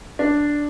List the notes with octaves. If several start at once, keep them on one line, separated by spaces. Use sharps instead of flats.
D4